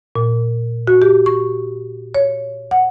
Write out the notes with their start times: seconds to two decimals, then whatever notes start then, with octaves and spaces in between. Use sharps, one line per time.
0.15 A#2
0.87 F#4
1.02 G4
1.26 C#6
2.15 C#5
2.71 F#5